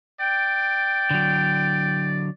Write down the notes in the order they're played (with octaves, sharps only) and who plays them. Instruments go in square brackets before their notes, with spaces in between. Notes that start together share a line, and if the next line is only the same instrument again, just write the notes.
[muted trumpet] D5 [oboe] G5
[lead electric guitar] D3 F#3